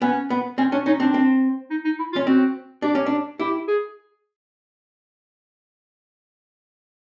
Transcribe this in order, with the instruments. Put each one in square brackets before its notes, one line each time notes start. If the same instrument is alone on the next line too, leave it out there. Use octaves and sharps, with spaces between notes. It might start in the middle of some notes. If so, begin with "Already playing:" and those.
[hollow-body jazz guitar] B3 [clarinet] C#4
[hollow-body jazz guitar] B3
[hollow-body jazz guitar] C4 [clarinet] C#4
[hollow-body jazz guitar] C#4 [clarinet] D4
[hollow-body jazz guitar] C#4 [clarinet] D#4
[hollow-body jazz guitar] C4 [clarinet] D4
[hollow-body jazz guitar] C4
[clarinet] D#4
D#4
E4
F4
[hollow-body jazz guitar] C#4
[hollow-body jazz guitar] C4 [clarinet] F#4
[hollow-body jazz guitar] D4 [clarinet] G4
[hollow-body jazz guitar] C#4
D4
[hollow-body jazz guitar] E4 [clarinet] G4
[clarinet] G#4